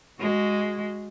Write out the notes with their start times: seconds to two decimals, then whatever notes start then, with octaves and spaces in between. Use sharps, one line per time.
0.19 G#3 F#4